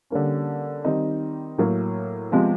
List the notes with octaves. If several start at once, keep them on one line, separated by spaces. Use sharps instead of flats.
D3 G3 A#3 C#4
D#3 G3 C4 D#4
A2 F#3 A#3
C3 F3 G#3 B3